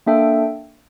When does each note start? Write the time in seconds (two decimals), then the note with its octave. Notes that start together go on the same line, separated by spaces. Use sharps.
0.06 A#3 D4 A4 E5 G5